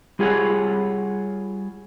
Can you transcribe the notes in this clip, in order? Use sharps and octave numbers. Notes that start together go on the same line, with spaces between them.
G3 F4 G#4 C#5 F#5